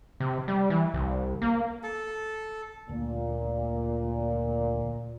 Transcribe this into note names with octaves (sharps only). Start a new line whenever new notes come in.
C3
G3
E3
C2
A#3
A4
D2 A#2